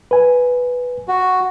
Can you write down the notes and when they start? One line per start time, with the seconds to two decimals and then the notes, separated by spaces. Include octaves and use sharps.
0.11 B4 G#5
1.08 F#4